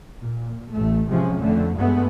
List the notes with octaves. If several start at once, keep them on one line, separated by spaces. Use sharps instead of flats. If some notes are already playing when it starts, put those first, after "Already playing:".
A#2
A1 A3
C3 F3 G#3 C#4
F2 D3 A3
G2 G#3 A3 B3